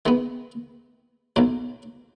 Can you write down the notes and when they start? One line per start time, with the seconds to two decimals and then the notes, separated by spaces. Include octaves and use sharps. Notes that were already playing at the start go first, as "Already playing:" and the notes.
0.06 D#3 G#3 B3
1.36 B1 B2 F#3